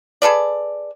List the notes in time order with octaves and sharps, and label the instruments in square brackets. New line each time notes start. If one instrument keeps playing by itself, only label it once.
[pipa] G#4 A4 B4 D5